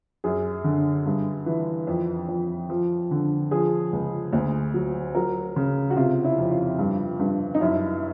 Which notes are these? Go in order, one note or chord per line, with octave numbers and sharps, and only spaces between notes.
F#2 G#4
D3
G2
E3
F2
F2
F3
D3
F3 G#4
C#2
D2
F#3
F#3 A#4
C#3
F#4
C3 F4
E4
F2
F4
G2
G2
D#4
F#2 E4